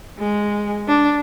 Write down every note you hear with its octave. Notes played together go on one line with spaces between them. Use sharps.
G#3
D4